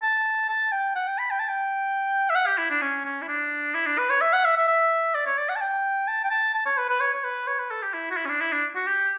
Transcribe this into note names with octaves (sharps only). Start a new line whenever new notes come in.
A5
A5
G5
F#5
G5
B5
G5
A5
G5
E5
F#5
G4
E4
D4
C#4
C#4
E4
D4
E4
D4
B4
C#5
E5
F#5
E5
E5
E5
D5
C#5
D5
F#5
A5
G5
A5
G5
A5
A5
C#5
B4
B4
C#5
C#5
B4
C#5
B4
A4
G4
E4
F#4
E4
C#4
D4
E4
D4
F#4
G4